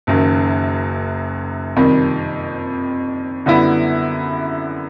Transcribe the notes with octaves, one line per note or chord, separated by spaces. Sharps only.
F#1 F#2 D#3
F2 C3 D#3 G3
F#2 D3 G3 B3 E4